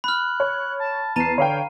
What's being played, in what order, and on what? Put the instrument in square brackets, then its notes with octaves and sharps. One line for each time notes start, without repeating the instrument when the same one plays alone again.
[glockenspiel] B5 F6 [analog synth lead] F#6
[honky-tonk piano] C#5
[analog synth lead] A5
[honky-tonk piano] E2 C7 [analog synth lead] A5 [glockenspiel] A#5 D#7
[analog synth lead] D3 [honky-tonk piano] C#5 F5 G5